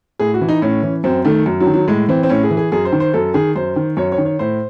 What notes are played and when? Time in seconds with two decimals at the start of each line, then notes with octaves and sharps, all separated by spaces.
0.19 A2 G#4
0.34 F#4
0.41 E3
0.49 D#4
0.62 A2 C#4
0.83 E3
1.04 F#2 C4
1.25 D#3 A3
1.46 F#2
1.60 F#3
1.67 D#3
1.74 F#3
1.88 A2 G#3
2.09 E3 C4
2.23 C4
2.30 A2 C#4
2.43 G#4
2.51 E3
2.57 G#4
2.72 F#2 G#4
2.85 C5
2.92 D#3
3.00 C5
3.13 F#2 A4
3.34 D#3 G#4
3.56 F#2 C5
3.76 D#3
3.97 F#2 C#5
4.12 C#5
4.18 D#3
4.25 C#5
4.39 A2 C5